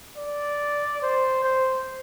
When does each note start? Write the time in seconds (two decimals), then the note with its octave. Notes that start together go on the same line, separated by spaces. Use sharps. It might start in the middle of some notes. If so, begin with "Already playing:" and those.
0.17 D5
1.02 C5
1.44 C5